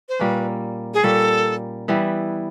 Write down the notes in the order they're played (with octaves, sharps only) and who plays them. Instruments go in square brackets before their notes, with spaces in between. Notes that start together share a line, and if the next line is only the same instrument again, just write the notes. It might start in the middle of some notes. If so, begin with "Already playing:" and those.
[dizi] C5
[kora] A#2 G3 A#3 C#4 [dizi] B4
[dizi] G#4
[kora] A#2 G3 A#3 C#4 [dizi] A4
[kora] E3 G3 B3 E4